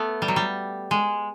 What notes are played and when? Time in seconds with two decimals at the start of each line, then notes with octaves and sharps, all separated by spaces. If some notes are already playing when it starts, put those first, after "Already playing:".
Already playing: A3 B3
0.22 G3
0.28 F#3
0.36 G3
0.91 G#3